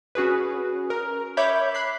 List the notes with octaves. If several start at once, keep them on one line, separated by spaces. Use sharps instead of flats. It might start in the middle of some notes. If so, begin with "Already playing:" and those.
C#4 F#4 G#4 B4
A#4
C#5 E5 B5 D6 G6
B5 F#6 B6 C7